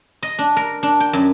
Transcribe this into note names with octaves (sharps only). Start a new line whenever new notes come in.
D#5
D4
A#4
D4
G5
F#2